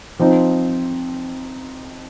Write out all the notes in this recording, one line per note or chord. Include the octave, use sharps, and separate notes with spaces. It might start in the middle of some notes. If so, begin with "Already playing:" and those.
F3 C4 D#4